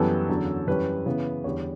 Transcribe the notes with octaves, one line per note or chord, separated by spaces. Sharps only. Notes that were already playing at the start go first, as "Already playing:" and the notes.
Already playing: F#2 E3 G3 B3 A4
E2 D3 F#3 C#4
F#2 E3 G3 C#4 B4
C#3 E3 B3
E2 D3 G3 C#5